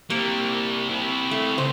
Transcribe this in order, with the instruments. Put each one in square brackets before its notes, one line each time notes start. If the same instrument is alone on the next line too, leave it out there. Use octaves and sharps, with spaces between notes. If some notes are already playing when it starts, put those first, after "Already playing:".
[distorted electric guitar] G3 C4 [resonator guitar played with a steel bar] A#3
[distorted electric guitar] C4 E4
[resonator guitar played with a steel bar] A3
[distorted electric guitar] C#2 [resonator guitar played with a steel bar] C5